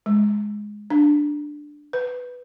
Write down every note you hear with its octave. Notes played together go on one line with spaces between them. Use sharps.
G#3
D4
B4